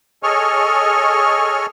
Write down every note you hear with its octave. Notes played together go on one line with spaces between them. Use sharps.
G#4 A4 C#5 D#5 C#6 F6